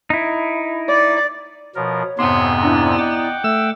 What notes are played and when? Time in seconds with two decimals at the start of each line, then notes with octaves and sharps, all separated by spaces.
0.10 D#4 E4
0.89 D5
1.75 B2 F3 A#4 C#5
2.19 F2 G#2 C3 B3 C6
2.62 D4 E4 D5 A#5
2.98 D#5 F#5 G5 D6
3.44 A3 E5 E6